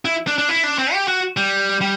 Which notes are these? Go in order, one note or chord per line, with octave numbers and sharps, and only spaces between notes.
E4
D4
D4
E4
D4
C4
G4
F#4
G3
G3